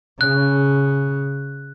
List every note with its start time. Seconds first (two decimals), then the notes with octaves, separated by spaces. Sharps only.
0.21 C#3 F#6